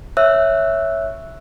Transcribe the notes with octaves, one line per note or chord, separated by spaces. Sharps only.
C#5 E5 E6 F#6